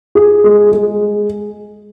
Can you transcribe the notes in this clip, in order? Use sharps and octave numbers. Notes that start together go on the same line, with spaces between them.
G#4
G#3
G#3